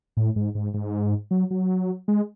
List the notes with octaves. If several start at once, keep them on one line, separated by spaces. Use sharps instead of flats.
A2
G#2
G#2
G#2
F#3
F#3
G#3